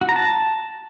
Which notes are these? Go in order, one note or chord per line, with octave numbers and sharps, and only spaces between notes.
F#4
A#5
A5